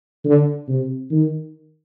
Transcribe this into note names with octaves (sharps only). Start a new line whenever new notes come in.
D3
C3
D#3